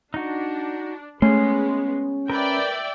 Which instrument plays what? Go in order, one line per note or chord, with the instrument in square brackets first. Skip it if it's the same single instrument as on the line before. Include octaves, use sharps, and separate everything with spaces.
[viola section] D4 [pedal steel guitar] D#4 F#4
[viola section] G#3 B3 [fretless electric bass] A3 [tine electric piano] C#4 [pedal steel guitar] C6
[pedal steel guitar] A#4 B4 [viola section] D5 E5 G5